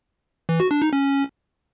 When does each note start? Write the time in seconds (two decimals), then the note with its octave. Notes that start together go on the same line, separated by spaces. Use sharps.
0.49 E3
0.60 F#4
0.71 D4
0.82 D#4
0.93 C#4